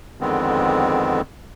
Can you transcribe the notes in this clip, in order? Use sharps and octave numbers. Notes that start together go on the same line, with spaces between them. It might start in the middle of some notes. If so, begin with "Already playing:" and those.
F2 D3 D#3 G#3 B3 C4